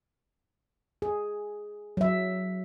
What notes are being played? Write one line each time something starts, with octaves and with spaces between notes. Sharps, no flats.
G#4
F#3 E5